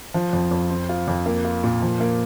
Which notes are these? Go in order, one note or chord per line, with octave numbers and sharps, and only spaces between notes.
F3
F2
F2
C4
F4
F2
A#3
F4
A#2
F3
A#3